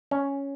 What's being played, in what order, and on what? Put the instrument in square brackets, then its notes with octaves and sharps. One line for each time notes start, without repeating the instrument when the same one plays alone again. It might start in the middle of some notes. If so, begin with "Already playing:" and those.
[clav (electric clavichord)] C#4